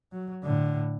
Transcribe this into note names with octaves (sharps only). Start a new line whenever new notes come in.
F#3
A2 D3